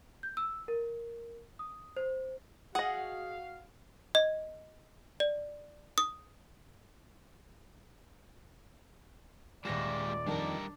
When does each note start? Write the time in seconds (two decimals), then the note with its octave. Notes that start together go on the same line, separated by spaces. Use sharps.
0.23 G6
0.37 E6
0.68 A#4
1.59 D#6
1.97 C5
2.75 F#4 G#4 D#5 F5 F#5
4.15 D#5
5.20 D5
5.98 D#6
9.65 D#1 G#3 F4 G4 D5 A#6 E7
10.27 F2 D#3 G3 D4 A#4 A5